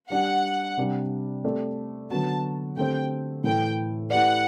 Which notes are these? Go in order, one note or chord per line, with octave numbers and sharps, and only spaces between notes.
G3 D4 G4 F#5
C3 G3 D4 G4
A3 C4 G4 D5
D3 F#3 B3 F#4 A5
D3 A3 C4 G4 C5 G5
A2 E3 A3 G5
A3 E4 G4 B4 D5 F#5